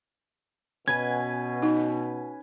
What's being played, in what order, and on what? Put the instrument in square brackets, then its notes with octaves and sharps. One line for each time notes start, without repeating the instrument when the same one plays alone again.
[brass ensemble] B2 [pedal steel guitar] C#4 B4 G#5 [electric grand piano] G#6
[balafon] D#4